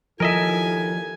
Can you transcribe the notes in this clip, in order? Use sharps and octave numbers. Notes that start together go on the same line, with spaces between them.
D#2 F3 E4 A4 A#4 D#5 E5 G#5